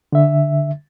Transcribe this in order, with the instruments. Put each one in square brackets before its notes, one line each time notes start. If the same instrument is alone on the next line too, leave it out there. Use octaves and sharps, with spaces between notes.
[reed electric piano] D3 E5